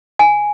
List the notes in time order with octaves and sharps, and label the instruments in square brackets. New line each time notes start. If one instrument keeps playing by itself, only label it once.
[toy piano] G#5